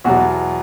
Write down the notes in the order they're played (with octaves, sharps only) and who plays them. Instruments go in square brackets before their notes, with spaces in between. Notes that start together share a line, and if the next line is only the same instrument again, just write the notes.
[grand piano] E2 B2 F#3 F#4